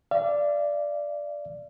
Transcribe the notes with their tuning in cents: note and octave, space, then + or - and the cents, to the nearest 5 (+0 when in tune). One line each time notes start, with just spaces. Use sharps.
D5 +0 F5 -45